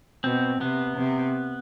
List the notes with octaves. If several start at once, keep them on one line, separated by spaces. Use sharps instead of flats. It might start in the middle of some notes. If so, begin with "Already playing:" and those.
B2 C4
C3 B3
C3